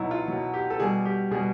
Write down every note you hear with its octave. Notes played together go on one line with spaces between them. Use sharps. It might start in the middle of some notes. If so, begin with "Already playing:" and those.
Already playing: B2 F#3 D#4 E4
F4
B2 F#3
G4
A4
B2 G3 G#4
G4
B2 G3 G#4